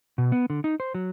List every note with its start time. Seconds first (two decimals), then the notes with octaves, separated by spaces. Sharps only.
0.18 B2
0.32 B3
0.50 D3
0.64 D#4
0.80 C5
0.95 F#3